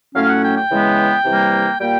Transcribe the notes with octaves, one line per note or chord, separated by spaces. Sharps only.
A2 F#3 A3 C#4 F5
F#5
G5
G5
C#3 E3 G#3 B3
C3 E3 G3 A#3
A#2 G3 A#3 G5